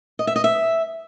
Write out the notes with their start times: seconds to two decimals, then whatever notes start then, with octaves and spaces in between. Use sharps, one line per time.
0.19 D#5
0.27 E5
0.36 D#5
0.44 E5